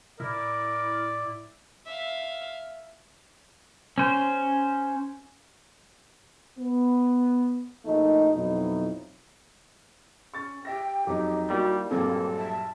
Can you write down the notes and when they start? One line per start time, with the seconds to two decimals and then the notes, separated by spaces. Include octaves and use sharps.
0.20 A2 E4 A#4 D5
1.87 E5 F5
3.98 C#4 C5
6.58 B3
7.85 A#1 A3 D#4
8.34 F2 B2 F#3 D#4 E4
10.34 C#4 C#6 A6
10.65 G4 E5 G5 A#6
11.07 F2 F#3 D#4 G4
11.50 G3 A#3 E4 F#4
11.91 A#1 G2 F#3 A#3 C4 A4
12.38 E5 A5